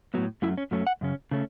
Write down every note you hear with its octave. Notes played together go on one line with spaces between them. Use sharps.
A2 F#3 B3
F#2 F#3 A3 C#4 E4
C#4
F#2 F#3 A3 C#4
F#5
F#2 C#3 C#4
C#3 A3 C#4